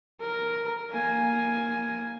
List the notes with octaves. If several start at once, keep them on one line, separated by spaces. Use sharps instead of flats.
A#4
A#3 G#5